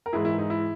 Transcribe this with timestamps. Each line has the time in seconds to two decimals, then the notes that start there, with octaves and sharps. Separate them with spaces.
0.06 A#4
0.13 G#2 E3 E4 G#4
0.25 E4
0.38 D#4
0.50 E4